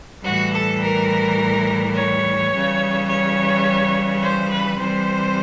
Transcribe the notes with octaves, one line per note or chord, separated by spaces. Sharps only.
A2 E3 G3 F#4
A4
A#4
C#5
C#3 E3 G3
C#5
C5
B4
C3 E3 G3 C5